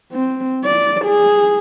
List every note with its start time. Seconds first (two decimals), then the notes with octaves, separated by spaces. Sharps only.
0.12 C4
0.65 D5
1.05 G#4